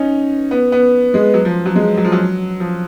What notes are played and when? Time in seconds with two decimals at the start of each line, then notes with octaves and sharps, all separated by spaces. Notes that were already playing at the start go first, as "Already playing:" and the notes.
Already playing: C#4 D#4
0.51 B3
0.72 B3
1.14 G#3
1.34 F#3
1.45 F3
1.66 F#3
1.75 G#3
1.97 F#3
2.05 F3
2.12 F#3
2.60 F3